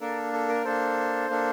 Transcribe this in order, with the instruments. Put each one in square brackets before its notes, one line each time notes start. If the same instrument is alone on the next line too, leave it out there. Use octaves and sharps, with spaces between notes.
[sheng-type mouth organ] A#3 D4 A4 A#4
A4
A#4
A#3 D4 A4 C5
A#3 D4 A4